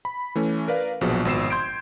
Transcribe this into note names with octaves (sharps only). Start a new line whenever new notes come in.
B5
E3 A3 C#4
A#4 B4 D5 F5
A#1 B2 F3 F#3 G#4
G#1 B2 E6 C7 E7
C6 G6 G#6 C7 D7